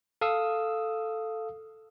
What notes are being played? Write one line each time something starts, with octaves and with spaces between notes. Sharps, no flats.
A4 F5 D#6 E6